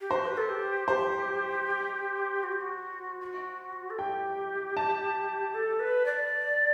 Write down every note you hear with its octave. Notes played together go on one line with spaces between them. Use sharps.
G4
F#4 C5
B4
A4
G4
G4 C5
F#4
G4
F#4
F#4
A4
G4 G5
A5
A4
B4
D5